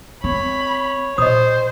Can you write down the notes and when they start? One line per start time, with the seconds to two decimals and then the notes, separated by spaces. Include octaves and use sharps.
0.24 C4 C#5 B5
1.18 A#2 C5 D#5 D#6